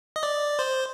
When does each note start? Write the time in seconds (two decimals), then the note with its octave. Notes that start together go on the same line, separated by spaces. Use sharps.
0.16 D#5
0.23 D5
0.59 C5